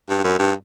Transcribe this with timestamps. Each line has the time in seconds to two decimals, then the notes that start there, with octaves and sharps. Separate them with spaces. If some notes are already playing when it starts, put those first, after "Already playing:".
0.09 G2
0.24 F#2
0.39 G2